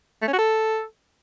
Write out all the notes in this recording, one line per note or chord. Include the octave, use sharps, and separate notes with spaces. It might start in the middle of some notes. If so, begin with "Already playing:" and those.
A3
C#4
F#4
A4